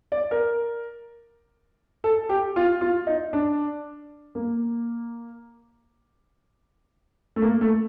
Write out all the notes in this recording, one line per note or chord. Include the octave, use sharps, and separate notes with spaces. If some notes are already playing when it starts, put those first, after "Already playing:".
D5
A#4
A4
G4
F4
F4
D#4
D4
A#3
A3
A#3
A3